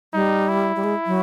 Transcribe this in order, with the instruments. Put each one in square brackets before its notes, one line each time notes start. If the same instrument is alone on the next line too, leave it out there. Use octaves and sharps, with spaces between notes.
[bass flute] G3 [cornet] D#4
[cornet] E4
[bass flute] G3
G#3
F#3